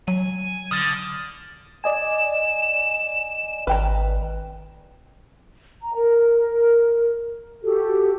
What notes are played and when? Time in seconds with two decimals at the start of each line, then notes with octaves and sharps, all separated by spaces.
0.08 F#3 G#5
0.71 D3 D#6 F6 A6
1.84 D5 D#5 G#5 E7
3.67 G#1 B4 G5 A#5
5.83 A#5
5.96 A#4
7.63 F#4 G4 A4